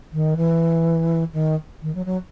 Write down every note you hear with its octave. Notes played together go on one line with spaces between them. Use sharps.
D#3
E3
D#3
D#3
F#3
F#3